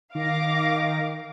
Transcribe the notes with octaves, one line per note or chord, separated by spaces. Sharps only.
D#3 F5 D6 A#6